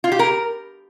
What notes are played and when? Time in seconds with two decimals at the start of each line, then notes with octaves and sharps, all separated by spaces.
0.04 F4
0.12 G4
0.19 A#4